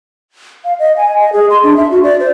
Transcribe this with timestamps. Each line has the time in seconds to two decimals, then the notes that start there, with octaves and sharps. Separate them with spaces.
0.65 F5
0.79 D#5
0.97 G#5
1.19 D#5
1.33 G#4
1.50 C6
1.64 D4
1.77 E5
1.91 F#4
2.03 D5
2.20 C5